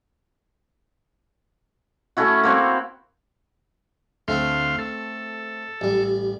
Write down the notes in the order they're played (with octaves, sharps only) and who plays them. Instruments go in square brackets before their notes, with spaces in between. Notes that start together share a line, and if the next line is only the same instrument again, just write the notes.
[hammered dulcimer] A3 C#4 E4 F#4
A#3 C4 F#4 C#5
[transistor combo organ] D2 F5 C6 [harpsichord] A3 C4
[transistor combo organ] A4
[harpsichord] A1 G3